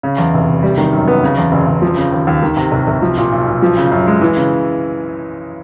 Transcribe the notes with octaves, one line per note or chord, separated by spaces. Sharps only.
C#3
E2
F1
F1
G3
D#3
F#2
B3
C#3
E2
F#1
F#1
F3
C#3
D#2
D#2
D#3
C3
C2
C2
F3
A#2
B1
B1
F3
C#3
F#2
G#3
E3
C#3